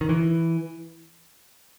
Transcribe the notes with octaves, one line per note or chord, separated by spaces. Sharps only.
D#3
E3